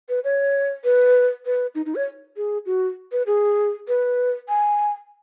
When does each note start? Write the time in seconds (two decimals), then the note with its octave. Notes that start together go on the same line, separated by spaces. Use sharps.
0.09 B4
0.24 C#5
0.84 B4
1.46 B4
1.75 D#4
1.86 D#4
1.95 C#5
2.37 G#4
2.66 F#4
3.12 B4
3.27 G#4
3.88 B4
4.49 G#5